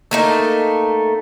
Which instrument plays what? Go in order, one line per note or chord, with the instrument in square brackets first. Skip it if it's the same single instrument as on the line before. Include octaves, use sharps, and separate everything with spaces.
[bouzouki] A3 A#3 D#4